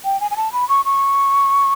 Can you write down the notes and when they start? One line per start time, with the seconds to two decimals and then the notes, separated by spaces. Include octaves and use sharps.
0.05 G5
0.21 G#5
0.31 G#5
0.37 A5
0.53 B5
0.69 C#6
0.85 C#6